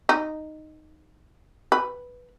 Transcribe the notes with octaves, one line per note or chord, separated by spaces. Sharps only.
D#4
B4